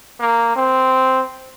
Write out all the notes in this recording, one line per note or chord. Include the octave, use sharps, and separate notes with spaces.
A#3
C4